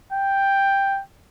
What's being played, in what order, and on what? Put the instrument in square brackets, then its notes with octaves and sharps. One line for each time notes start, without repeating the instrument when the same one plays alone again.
[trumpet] G5